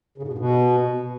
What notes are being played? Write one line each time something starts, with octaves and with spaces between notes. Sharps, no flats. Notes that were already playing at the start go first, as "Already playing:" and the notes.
C#3
G#2
B2
G2
B2